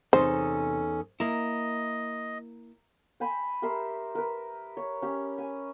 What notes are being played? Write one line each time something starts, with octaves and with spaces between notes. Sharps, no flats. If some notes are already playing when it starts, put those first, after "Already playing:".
E2 C3 C#4 D#4 A4 C5
A#3 E4 D#5 A#5
C5 G5 G#5 B5
G4 A#4 E5 C6
A#4 B4
C#5
C#4 G4
G#5